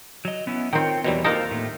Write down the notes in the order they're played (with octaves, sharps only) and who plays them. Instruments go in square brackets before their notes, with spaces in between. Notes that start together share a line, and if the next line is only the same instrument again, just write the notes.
[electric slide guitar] F#3 D#5
B3 C#4 E4
[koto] D#3 C4 [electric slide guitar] F4 C#5 G5
[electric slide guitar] E2 E3 D#4 [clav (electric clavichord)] B2 F#3 G3
[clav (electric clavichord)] D#2 F4 D#5 [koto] D#4 A4 A#4 [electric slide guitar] C5 F5
[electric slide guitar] A2 A3 A#3